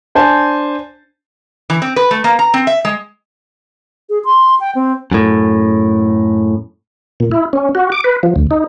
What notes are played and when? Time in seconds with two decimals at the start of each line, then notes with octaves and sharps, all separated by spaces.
0.15 D4 C5 G#5 A5
1.70 E3
1.82 C4
1.96 B4
2.11 A3
2.24 A#3
2.39 A#5
2.54 C4
2.67 E5
2.85 G#3
4.10 G#4
4.25 C6
4.60 G5
4.75 C4
5.12 F#2 A2
7.20 A#2
7.31 E4
7.53 C#4
7.75 F#4
7.92 D6
8.04 B4
8.23 F3
8.36 D2
8.51 D#4